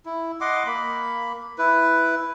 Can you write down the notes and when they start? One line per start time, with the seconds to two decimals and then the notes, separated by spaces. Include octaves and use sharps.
0.06 E4
0.41 D#5 F#5 C6 D6
0.66 A#3 B5
1.58 E4 B4